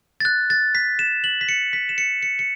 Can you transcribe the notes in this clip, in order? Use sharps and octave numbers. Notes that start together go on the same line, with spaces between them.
A6
F#6
A6
B6
E7
F#7
B6
C#7
B6
E7
C#7
C#7
C#7